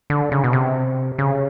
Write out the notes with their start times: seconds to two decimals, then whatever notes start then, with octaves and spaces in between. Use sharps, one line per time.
0.10 D3
0.32 C#3
0.44 B2
0.53 C3
1.18 C#3